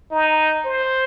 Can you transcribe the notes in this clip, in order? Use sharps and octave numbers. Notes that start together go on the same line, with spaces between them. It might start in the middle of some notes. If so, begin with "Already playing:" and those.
D#4
C5